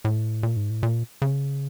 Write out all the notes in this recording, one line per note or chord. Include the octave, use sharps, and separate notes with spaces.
A2
A#2
G#2
A2
A#2
C#3